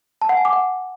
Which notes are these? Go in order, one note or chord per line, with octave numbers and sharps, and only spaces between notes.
A5
F#5
G#5
D6
F#5